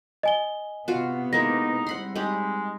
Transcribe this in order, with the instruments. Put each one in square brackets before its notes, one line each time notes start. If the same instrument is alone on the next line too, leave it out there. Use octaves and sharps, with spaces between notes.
[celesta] D#5 G#5 G7
[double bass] C3 B3 [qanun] F4 F#4
[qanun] G#3 A#3 E4 [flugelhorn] D#4 [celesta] A#6
[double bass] G3 C4 [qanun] F#5 B5 C6
[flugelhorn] G#3 [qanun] D#4 G4 B5